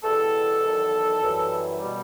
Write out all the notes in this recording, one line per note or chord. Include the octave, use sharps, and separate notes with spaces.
E2 B2 G3 A4
E2 D#3 F#3
F#2 E3 G3
B2 G3